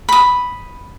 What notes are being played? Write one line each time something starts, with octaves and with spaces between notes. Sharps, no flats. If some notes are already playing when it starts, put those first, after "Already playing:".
B5 D#6